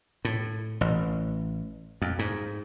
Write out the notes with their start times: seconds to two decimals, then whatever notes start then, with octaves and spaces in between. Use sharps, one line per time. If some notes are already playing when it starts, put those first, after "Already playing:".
0.25 A2
0.81 A1
2.02 F2
2.19 G#2